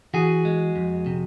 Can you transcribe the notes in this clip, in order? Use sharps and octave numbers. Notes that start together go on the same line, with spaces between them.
E3 F#4 G#4
G#3
F2
C3